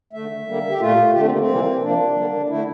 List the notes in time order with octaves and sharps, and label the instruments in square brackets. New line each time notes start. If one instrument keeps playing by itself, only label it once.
[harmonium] D3 A3 E5
D3 G3 A#3
G4
A#2 A3 F4
D3 A3 G4
C4
A#3
C4
C3 E3 G3 A#3
C3 F3 A#3 D4
D3 G3 A#3
D3 A3 E4